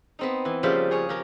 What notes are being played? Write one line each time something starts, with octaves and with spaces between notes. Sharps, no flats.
B3 C4 D#4
E3
C#3 F3 G3 A#3 C5 E5
G#4 C#5 G#5
F3 G4 A#4